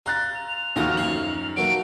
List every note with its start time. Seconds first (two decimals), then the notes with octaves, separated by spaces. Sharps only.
0.06 F4 A#5 F#6 A6
0.35 F7
0.76 D#2 F3 A3 D#4 F4 F#4 D#6 F6
0.97 F#2 C#5 F5 F#7
1.57 F#3 A3 A#3 D7